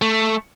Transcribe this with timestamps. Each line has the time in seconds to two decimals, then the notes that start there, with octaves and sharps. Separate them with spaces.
0.02 A3